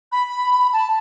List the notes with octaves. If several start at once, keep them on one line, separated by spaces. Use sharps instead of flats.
B5
A5